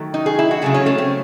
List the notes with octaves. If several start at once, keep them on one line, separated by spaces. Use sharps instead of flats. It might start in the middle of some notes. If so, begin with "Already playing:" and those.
Already playing: D#3 F#3 A3
D#4
G#4
E4
F#4
C#3 F#3 A3 G#4
C#4
A3
C4